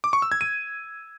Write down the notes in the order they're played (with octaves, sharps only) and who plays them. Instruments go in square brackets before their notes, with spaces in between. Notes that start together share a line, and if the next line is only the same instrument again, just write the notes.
[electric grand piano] D6
C#6
E6
G#6
D#7